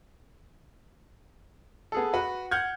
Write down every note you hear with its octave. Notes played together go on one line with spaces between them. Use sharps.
B3 G#4 A4
F#4 B4
F#5 F6 G6 G#6